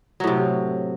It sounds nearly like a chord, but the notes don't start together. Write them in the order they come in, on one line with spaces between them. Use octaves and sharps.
F#3 A2 C3